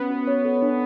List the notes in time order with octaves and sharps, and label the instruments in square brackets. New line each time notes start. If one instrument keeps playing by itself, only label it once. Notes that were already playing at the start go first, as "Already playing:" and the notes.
Already playing: [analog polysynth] B3 [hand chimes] C#4
[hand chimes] F#4
C#5
A4
D4